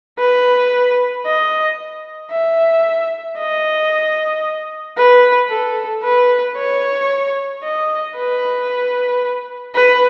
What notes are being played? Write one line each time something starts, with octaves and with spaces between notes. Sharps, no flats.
B4
D#5
E5
D#5
B4
A4
B4
C#5
D#5
B4
B4